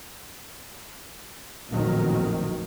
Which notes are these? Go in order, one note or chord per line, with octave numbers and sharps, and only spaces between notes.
A1 F2 A#2 D#3 F#3